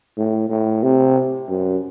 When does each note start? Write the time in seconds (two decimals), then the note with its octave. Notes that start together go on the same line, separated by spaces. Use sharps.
0.17 A2
0.49 A2
0.83 C3
1.49 F#2